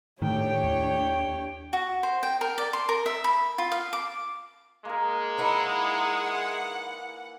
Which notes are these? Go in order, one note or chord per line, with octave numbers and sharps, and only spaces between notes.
A2 D#3 A3 D4 G4 C#5 G5
D#2
F#4
C5
G5
A#4
D5
C6
A#4
E5
B5
F4
F5
D6
G#3 A#3 A#4
E3 D#4 E4 F#5